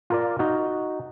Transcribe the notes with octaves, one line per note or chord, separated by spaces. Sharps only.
F4 A#4 D5
D#4 F#4